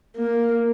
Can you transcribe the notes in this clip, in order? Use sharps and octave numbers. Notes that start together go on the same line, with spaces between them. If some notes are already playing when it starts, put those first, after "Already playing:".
A#3